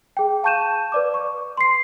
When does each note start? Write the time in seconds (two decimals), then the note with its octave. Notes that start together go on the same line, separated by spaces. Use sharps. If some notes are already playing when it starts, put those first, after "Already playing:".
0.17 G#4 G5
0.43 F5 A5 C#6 G6 D#7 E7
0.92 B4 D5 D6
1.14 C#6
1.57 C6 C7